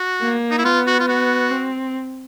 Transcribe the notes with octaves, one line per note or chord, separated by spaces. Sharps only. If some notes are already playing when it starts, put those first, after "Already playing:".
Already playing: F#4
A#3
D#4
E4
B3 F4
F#4
F4
F#4
C4